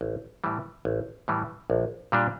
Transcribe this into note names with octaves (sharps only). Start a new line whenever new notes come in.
A1
A2 E3 G3
A1
A2 E3 G3
A#1
A#2 G3 D4